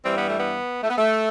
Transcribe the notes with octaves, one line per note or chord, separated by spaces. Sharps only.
G2 E3 G3 C4
B3
A3
B3
A3
B3
A3